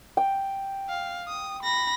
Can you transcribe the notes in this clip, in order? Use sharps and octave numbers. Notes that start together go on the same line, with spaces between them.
G5
F5
D#6
B5 A#6